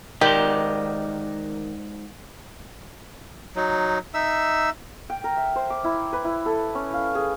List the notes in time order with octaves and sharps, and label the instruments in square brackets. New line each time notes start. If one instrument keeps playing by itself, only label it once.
[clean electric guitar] G#2 D5 C6 [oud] D#3 [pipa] G4
[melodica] F#3 D#4
D#4 E5 E6
[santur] G5
A#4
E5
C5
D6
E4
B4
E4
A4
C#4
F5
G#4